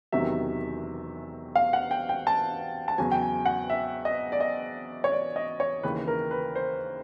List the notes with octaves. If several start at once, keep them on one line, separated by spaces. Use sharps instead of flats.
E1 E2 C3 D#3 F#3 E5
F5
F#5
G5
G5
A5
A5
E2 C#3 F#3 G#5
G5
G#5
F#5
E5
D#5
D5
D#5
C#5
D5
D#5
C#5
D#2 C#3 E3 B4
A#4
B4
C5